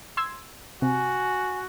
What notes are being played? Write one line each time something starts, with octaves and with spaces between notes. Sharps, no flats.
C6 E6 G#6
C3 F#4 G#5